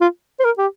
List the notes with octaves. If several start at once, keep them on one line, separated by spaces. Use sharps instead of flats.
F4
C5
A#4
G4